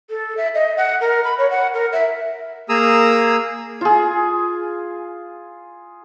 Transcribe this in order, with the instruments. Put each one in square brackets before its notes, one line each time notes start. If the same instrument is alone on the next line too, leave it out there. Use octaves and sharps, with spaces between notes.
[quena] A4
E5
D#5
F#5
A#4
B5
C#5
F#5
A#4
E5
[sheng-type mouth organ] A#3 G#4 A#5 D#6 E6
[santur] F4 G#4